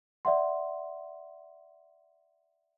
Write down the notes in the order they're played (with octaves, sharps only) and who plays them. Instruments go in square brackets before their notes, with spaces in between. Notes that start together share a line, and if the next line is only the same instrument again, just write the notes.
[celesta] D5 E5 F#5 C6